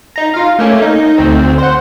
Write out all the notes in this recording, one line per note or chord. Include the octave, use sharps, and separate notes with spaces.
D#4 A#5
F4 F5
A3 A#3 C#4
D#4
D2 C4
C5 F#5